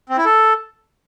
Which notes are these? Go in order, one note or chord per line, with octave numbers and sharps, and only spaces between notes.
C4
E4
A4